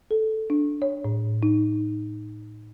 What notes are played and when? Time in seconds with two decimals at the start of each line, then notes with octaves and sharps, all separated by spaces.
0.11 A4
0.50 D4
0.82 C#5
1.05 A2
1.43 D#4